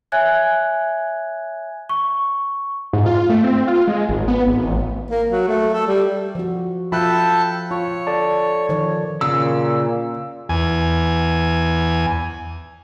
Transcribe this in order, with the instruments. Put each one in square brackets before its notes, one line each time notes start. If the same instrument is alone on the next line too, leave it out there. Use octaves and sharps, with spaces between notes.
[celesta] C#5 E5 G#5 F#6 G#6
C#6
[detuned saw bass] G#2
F4
A3
C4
F4
G#3
G#1
B3
G#1
A1
[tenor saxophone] A#3
F#3
A3
A4
G3
[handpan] F3 F#4
[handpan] F3 F4 E5 [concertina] A4 G5 A5 [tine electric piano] B5 F#6
[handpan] F4 [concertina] C#5
[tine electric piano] A4 D5 A5
[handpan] D#3 F3 C#5
[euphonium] A#2 [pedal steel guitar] C#3 C#4 [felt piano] E6
[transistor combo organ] E2 G#5